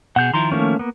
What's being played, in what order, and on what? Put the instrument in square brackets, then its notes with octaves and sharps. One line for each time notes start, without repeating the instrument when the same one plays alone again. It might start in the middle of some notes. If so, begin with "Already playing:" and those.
[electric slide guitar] B2 G#4 [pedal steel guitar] F#5 G6
[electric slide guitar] D#3 F3 E4 [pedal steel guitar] A#5 C6
[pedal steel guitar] A3 A#3 C#4
A#3 B3